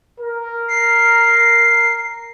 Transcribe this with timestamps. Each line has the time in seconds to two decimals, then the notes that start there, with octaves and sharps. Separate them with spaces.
0.19 A#4
0.68 C7